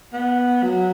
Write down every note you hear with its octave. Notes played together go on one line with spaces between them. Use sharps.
B3
F#3